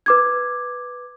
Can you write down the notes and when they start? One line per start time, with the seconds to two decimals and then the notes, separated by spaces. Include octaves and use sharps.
0.06 B4 D6 G#6